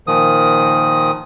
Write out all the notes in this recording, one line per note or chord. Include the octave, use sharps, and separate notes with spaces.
A#2 D#3 F3 D#6